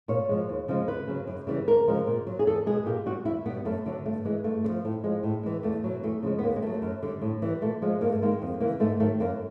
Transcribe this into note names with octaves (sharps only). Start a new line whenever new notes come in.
A#2 C#5
F3 G#3
D#2
C#3 F3 G#3
D2 B4
C#3 F#3
F#2
C#3 E3 G3
D2 A#4
C#3 F3 G#3
A#2
F#3
G#4
E2 A4
B2 G#3 G#4
A#2 G4
G3 F#4
E2 E4
B2 G3 B3
F#2 A3
D3 F#3
G2 A3
E3 G#3
G2 A3
D3
F3
A2
F3 G#3
A2
E3 G#3
E2 A3
B2 F#3
E2 A3
C#3 F3 G#3
B3
D#2 A#3
G#3
D#3 F#3 A3
F#2
D3 G3
A2
E3 G3
A#2 A3
F3 G#3
G2 A#3
A3
D#3 G#3 A#3
F2
C#3 E3 A#3
G#2 A3
D#3 F#3 A3
F#2 A#3